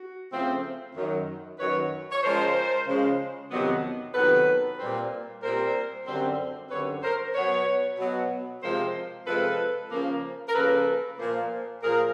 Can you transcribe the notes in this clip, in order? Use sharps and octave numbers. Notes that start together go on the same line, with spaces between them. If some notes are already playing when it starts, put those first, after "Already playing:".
Already playing: F#4
C#3 F3 A3 C4
F#2 D#3 F#3
F#2 D#3 F#3 B4 C#5
C#5
C#3 F3 G#3 A#4 C5
C#3 F3 G#3
F2 C3 D#3 F#3 B3
F2 C3 D#3 F#3 B3 A4 B4
A#2 G3 C4
A#2 G3 C4 A#4 C5
F#2 D3 G3 C4
F#2 D3 G3 C4 B4 C#5
A#4 C5
B2 F#3 B3 B4 C#5
B2 F#3 B3
C3 F3 G#3 C4 A#4 C5
C3 F3 G#3 C4 A4 B4
C#3 F3 A#3
A#4
C#3 F3 A#3 A4 B4
A#2 F3 A#3
A#2 F3 A#3 G#4 A#4